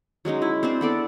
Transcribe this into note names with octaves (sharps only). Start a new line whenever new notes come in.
F#3 G#3 C#4 D#4
E4
C4 D4 C5
B3 A4 D5